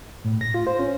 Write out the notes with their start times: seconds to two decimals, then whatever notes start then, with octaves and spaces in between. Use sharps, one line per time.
0.24 A2
0.41 A#6
0.54 F4
0.67 C5
0.79 C#4